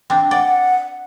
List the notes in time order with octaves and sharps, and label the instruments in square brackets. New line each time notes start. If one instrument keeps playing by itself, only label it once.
[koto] C4 D4
[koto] D5 [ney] F#5